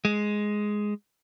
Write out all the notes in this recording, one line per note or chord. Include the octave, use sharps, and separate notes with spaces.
G#3